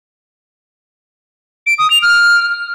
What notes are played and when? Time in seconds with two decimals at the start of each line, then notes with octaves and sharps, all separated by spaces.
1.67 D7
1.79 D#6
1.90 F7
2.02 F6